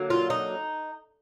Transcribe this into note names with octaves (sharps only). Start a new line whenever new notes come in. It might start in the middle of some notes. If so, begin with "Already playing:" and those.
Already playing: D3 F#3 A#3
F4
D#4